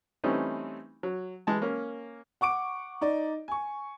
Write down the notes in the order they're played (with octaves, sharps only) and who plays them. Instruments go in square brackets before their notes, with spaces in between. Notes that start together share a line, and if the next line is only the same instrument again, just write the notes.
[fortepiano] E3 G3 A3 C4 C#4 D#4
F#3
E3 G#3 A5
A#3 C#4
[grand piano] F#5 C#6 D6 D7
D#4 D5
G#5 C#6